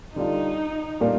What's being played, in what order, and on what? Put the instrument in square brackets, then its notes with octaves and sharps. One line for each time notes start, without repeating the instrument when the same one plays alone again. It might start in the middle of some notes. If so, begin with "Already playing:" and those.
[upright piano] D3 G3 D4 F4 [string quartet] D#4
[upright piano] A#2 G3 A#3 D4